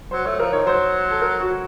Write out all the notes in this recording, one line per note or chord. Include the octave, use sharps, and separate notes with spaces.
F#3 C5
A3 C#5
F3 A#4
D#3 C#5
F#3 C5
A4
A#4
F#4